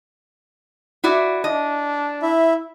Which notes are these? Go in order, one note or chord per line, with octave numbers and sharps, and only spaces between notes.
E4 F#4 D5
D4 D#5
E4 E5